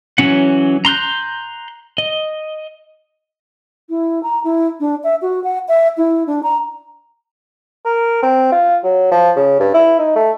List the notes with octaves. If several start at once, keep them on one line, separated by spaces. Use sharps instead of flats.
E3 F#3 C#4 F#5
A#5 C6 F#6 G6
D#5
E4
A#5
E4
D4
E5
F#4
F#5
E5
E4
D4
A#5
A#4
C4
F4
F#3
F3
C#3
G2
E4
D#4
A3